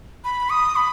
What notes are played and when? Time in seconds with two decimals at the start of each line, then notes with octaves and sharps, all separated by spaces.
0.24 B5
0.50 D#6
0.76 B5